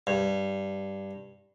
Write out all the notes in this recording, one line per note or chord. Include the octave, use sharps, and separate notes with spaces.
G2